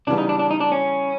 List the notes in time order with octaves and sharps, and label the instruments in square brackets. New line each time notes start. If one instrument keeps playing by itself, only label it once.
[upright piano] C#3 E3 G3 B3 [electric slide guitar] D4
[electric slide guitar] D#4
D4
D4
D#4
D4
C#4